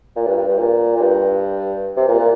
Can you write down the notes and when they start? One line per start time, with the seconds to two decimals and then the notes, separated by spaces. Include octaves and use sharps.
0.16 A#2
0.27 G2
0.37 G2
0.48 G2
0.59 A#2
0.96 A#2
1.01 G2
1.97 C3
2.08 A#2
2.19 A#2